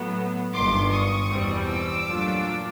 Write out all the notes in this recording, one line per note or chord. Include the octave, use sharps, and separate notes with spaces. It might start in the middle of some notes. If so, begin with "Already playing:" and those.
Already playing: A2 F#3 B3
G1 G2 D#3 C6 D6
C#6 D#6
E2 B2 G3 C4
D6 E6
A#2 F#3 A3 D4 F4